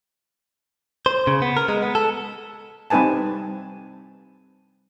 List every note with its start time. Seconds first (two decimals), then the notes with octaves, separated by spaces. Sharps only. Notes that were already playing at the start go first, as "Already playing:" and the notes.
1.06 C5
1.27 C#3
1.42 B3
1.57 A#4
1.69 G#3
1.82 B3
1.95 A4
2.90 G3 C4 D#4 B4 G#5 A5